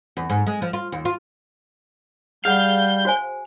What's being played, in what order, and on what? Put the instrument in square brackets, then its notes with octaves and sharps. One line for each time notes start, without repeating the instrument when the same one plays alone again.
[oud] E2
G#2
G#3
F3
F4
D#2
F4
[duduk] G3 [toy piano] G#4 F#5 [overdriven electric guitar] F5 [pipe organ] G6
[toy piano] F#4 C5 G#5